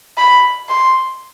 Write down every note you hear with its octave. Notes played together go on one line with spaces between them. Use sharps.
B5
C6